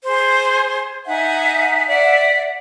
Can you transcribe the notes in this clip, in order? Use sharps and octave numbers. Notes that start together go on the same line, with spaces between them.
G#4 C5
D#4 E5 F#5 G#5
D5 E5 F#5